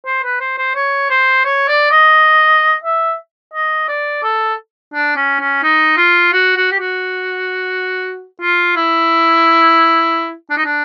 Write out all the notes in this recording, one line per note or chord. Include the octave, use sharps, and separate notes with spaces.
C5
B4
C5
C5
C#5
C5
C#5
D5
D#5
E5
D#5
D5
A4
D4
C#4
C#4
D#4
F4
F#4
F#4
G4
F#4
F4
E4
D4
D#4
D4